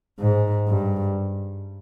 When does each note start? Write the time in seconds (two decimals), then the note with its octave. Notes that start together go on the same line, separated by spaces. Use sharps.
0.20 G#2
0.69 G2